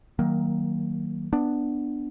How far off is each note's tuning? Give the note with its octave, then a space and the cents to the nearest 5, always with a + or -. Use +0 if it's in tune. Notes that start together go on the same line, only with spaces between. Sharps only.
D#3 +20 F#3 +25 A#3 +0
B3 +0 D4 +5